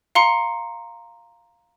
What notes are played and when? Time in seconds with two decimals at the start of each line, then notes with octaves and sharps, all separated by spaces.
0.15 F5 A#5 C6 C#7